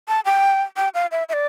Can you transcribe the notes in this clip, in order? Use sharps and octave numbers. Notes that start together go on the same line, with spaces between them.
A5
G5
G5
F5
E5
E5
D5